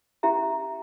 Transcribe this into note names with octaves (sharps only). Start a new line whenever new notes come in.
C#4 E4 G4 E5 A#5